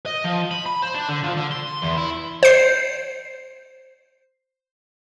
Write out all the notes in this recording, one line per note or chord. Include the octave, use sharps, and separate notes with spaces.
D#5
F3
B5
B5
C5
D4
D3
F3
D3
C6
E2
E4
C5 C7